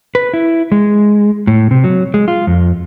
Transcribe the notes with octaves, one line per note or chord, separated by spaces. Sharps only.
B4
E4
G#3
A2
C3
F#3
G#3
F4
F2